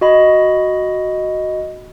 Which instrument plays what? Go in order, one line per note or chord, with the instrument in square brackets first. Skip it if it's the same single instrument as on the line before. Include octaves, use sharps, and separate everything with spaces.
[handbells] F#4 D#5 B5